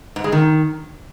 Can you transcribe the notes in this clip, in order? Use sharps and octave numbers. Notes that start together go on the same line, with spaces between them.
G#2
G#3
D#3